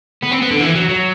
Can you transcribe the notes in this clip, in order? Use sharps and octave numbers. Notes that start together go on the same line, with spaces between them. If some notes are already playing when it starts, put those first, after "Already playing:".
B3
C4
B3
D3
E3
F#3
F#3